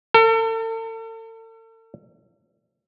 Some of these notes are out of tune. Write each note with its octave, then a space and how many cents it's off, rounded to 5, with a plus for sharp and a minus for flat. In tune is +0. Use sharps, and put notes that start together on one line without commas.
A4 +40